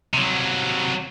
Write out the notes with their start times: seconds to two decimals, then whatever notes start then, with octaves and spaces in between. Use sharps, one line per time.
0.14 C3 F#3